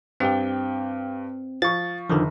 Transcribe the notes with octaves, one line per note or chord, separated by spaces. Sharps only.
G2 C4 G4 G5
F3 C#6 A6
F1 D3 D#3 F3